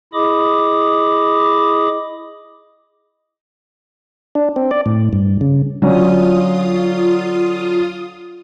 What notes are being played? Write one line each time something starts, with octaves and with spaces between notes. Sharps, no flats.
E4 G#4 D#5 B5 D6 D#6
D4
C4
D5
A2
G2
C#3
D3 F#3 C#4 F4 D#6